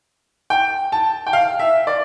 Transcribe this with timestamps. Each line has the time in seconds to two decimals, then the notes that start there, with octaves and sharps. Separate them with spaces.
0.50 G5
0.92 A5
1.27 G5
1.33 F5
1.59 E5
1.87 D5